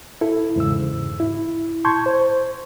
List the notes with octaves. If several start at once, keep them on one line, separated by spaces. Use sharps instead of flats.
E4 A4
E2 G#2 C#3 E6
E4
A5 C6 C#6 G6 G#6
C5